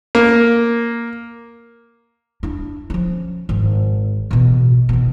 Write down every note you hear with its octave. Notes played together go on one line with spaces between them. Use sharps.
A#3
D4 E4
F3 C#4
G#1
A1 B2
B2 D#3